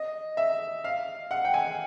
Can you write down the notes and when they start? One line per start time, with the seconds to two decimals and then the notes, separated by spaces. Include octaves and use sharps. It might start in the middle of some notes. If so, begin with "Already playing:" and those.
Already playing: D#5
0.37 E5
0.84 F5
1.31 F#5
1.45 G5
1.54 G#5